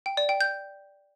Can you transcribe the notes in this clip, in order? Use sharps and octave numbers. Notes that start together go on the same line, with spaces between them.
G5
D5
G5
G6